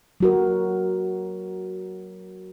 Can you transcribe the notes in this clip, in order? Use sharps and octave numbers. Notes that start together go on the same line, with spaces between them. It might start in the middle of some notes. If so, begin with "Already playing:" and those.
F#3 F#4 A#4